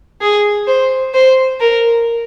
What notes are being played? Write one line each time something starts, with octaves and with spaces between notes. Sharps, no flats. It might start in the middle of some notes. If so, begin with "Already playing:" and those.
G#4
C5
C5
A#4